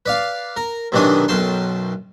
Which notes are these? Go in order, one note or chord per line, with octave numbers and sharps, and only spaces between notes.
B4 D5 F5
A#4
B1 C3 D#3 E3 D4 D#6
B1 F#2 G5 A5 C6